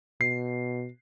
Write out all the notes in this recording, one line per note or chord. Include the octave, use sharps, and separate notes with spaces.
B2 C7